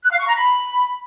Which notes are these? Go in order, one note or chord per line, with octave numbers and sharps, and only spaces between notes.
F#6
F5
C#6
A#5
B5